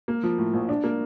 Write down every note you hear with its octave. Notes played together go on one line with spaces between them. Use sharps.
A#3
F3
A2
A#1
D4
A#3